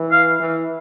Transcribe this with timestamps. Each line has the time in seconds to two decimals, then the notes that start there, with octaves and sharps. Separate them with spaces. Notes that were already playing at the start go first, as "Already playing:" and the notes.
Already playing: E3
0.12 F5
0.40 E3